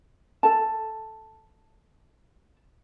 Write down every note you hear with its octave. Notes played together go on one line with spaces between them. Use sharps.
A4 A5